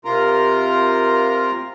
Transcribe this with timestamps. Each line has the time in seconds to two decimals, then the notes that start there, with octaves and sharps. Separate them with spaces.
0.05 C3 F4 A#4 A#5